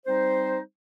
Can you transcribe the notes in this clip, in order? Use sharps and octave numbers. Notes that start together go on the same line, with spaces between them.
G3 C4 D#4 C5